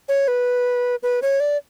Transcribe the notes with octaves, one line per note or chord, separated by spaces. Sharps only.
C#5
B4
B4
C#5
D5